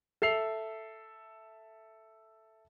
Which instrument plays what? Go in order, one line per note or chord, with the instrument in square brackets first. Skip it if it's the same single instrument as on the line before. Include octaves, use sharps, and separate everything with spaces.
[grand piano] A4 E5 C7 F7